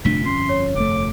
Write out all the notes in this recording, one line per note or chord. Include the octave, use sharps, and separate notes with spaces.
G1 F2 C3 F3 A3 D4 B6
C#4 C6
C#5
F1 B2 A3 D6